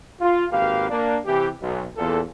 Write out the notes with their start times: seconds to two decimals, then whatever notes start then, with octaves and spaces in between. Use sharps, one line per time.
0.21 F4
0.52 G#1 A#3 G4 B4 F5
0.90 A#3 D4
1.26 C3 E3 G4
1.61 B1
1.97 E2 A#2 A4